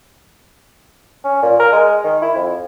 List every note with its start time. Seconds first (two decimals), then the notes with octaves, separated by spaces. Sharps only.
1.24 C#4
1.43 A#2
1.60 A#4
1.72 G#3
2.04 D#3
2.22 E4
2.35 F2